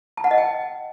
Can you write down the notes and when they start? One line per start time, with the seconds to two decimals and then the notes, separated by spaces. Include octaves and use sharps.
0.17 A5
0.24 F#5
0.31 D#5
0.38 G5